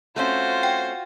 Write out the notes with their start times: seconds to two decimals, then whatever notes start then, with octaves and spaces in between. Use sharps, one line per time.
0.16 A3 C4 C#4 F4 F#4 C5
0.63 G5